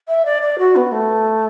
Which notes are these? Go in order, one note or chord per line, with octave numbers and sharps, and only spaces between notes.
E5
D5
D5
F#4
B3
A3